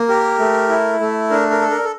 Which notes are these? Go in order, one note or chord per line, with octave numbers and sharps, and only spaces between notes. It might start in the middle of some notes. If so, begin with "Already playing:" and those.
Already playing: A#3
G4 A#4
A3
E4
A3
D4 A#4
A#4
A4
A#4
A4